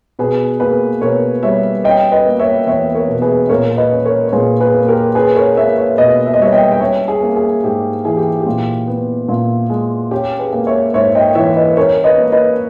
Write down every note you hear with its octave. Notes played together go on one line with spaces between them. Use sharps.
B2 G#4 B4
A#3 G#4 B4
B2 A#4 C#5
G3 C#5 E5
C#4 D#5 G5
B4 D#5
A#3
C#5 E5
E2 C#5 E5
A#4 C#5
B2
G#4 B4
A#2 A#4 C#5
B4 D#5
C#4
A#4 C#5
C#5
A#2 G#4 B4
G#4 B4
A#3
G4 A#4
C#4 G#4 B4
A#4 C#5
A#3 C#5 E5
C#5 E5
B2 B4 D#5
E5
D#5
G3 C#5 E5
D#5 G5
G5
C#4 C#5 E5
G#4
A#3
G#4
G#2 G4
E3 G#4
G4
G4
A#2
B3
A#2
G#3
C#4 G4
G#4 B4
A#3
C#5 E5
G#2 C#5 E5
D#5 G5
E3 C#5 E5
B4 D#5
C#4 A#4 C#5
B4 D#5
A#3
B4 D#5